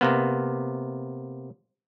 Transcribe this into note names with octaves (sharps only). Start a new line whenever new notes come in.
C3 A#3 B3